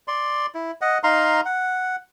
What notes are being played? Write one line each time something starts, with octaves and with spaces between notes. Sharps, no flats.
D5 C6
E4
D#5 F#5
D#4 F5 A#5 C6
F#5